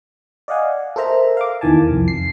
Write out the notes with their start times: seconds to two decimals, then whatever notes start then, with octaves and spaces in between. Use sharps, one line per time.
0.48 D5 D#5 F5 F#5 G#5
0.96 A4 A#4 C5 E5 A#5
1.37 F5 D6
1.61 E2 D#3 E3 G#5 A5
1.88 C2 F2
2.08 C7